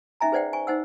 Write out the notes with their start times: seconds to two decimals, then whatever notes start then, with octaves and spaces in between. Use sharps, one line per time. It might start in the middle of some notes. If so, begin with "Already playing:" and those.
0.21 C#4 D#4 E5 G#5 A#5
0.32 G#4 B4 C5 D5 F#5 G5
0.53 G#5 C#6
0.67 D#4 C5 F#5 E6